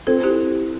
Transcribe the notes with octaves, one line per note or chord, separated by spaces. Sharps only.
C4 F4 A4
E4 G4